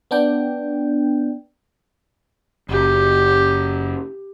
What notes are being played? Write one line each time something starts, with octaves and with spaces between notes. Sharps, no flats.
B3 D4 G5
F#1 G4